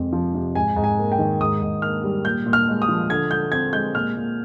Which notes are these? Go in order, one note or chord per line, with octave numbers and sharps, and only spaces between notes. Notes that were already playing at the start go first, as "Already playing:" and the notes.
Already playing: F2 C3 G#3
F3
C3
G#2 G#5
G#2
G#5
A#3
G5
D#3
G#2 D#6
G#2
A#3 F6
G3
A#2 G6
A#2
F6
G#3
D#6
F3
D3 G#6
D3 G6
C4 G#6
G#3 G6
A#2 F6
A#2